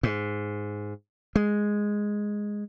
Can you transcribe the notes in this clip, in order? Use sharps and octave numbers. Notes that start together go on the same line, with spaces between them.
G#2
G#3